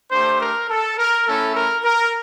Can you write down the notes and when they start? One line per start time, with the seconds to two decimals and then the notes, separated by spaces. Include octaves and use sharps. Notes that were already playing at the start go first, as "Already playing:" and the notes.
0.12 A3 D4 G4 C5
0.41 A#4
0.70 A4
0.98 A#4
1.27 A3 C#4 E4 A4
1.56 A#4
1.84 A#4